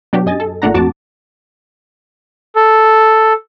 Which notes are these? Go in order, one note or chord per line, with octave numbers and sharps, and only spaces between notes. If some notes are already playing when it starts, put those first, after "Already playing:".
B2 F#3 D4 F#4 G4
F#2 D#5 G#5 A6
A4
G#1 A#2 A3 D4 F#5 A#5
F2 F#4 A5 D6 A6
A4